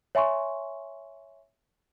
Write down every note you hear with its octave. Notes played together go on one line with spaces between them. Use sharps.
C#5 E5 G#5 C6 C#6